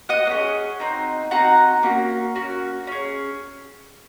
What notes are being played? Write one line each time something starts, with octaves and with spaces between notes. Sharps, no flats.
D#5 F#5
A#3
C#4 G#4
C4 D#4 F#4
C4 D#4 F#4 F#5 A#5
A#3 C#4 F#4
A#3 C#4 F#4
C#4 G#4